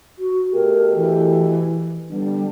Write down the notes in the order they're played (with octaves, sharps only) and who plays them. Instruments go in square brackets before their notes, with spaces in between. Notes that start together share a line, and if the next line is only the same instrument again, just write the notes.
[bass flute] F#4
[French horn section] B2 A3 G4 [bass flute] A#4
[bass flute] E3
[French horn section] D3 B3 D4 [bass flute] G3